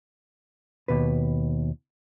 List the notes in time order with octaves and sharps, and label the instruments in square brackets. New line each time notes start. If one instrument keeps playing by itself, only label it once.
[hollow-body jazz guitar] D#2 B2 B4